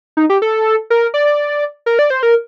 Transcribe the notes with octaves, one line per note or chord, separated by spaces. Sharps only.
D#4
G4
A4
A#4
D5
A#4
D5
C5
A#4